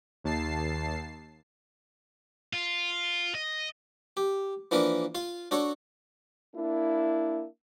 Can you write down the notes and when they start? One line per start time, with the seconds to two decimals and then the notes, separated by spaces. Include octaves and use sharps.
0.24 D#2 A5 C7
2.53 F4
3.35 D#5
4.17 G4
4.71 E3 F3 A#3 D4 A#4 B4
5.15 F4 F5
5.51 D4 F#4 A4 C#5
6.55 A#3 D4 E4